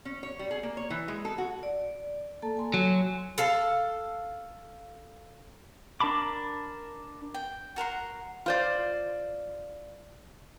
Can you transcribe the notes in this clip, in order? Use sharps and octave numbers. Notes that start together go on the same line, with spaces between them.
C#4
C#5
G3
G#4
A#3
C#5
E3
G#3
A4
F#4
D5
A#3 A4 A5
G#5 C6
F#3
A4 F5 A5
D4 A#4 A5 B5 D6
G5
F#4 A#4 F#5 C6
F4 C5 D5